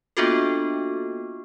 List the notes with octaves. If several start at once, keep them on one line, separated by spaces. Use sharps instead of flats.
A#3 B3 D4 F4 F#4 A4